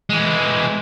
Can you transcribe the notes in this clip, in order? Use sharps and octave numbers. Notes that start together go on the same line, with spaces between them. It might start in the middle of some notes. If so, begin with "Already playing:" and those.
E3 G#3